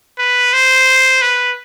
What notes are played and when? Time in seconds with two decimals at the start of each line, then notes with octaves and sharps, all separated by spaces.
0.18 B4
0.53 C5
1.22 B4